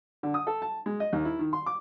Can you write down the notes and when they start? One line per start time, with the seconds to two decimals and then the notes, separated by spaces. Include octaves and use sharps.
0.23 D3
0.34 D#6
0.47 A4
0.62 A5
0.86 G#3
1.00 D#5
1.13 D#2
1.25 E4
1.39 D#3
1.53 C6
1.66 D6